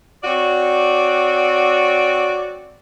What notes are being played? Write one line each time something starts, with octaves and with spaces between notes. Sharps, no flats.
C4 F#4 C#5 D5